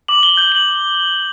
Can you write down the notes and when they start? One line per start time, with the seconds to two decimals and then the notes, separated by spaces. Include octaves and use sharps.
0.08 D6 F#7
0.23 G7
0.37 G6 G7
0.52 F#7